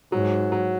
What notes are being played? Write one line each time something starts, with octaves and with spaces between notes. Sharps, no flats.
G#2 F#3
F#3